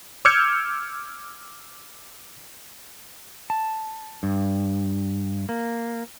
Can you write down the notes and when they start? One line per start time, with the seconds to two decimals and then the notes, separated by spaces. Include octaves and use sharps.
0.25 D6 E6 F6 G6 G#6 C#7
3.50 A5
4.23 G2
5.49 A#3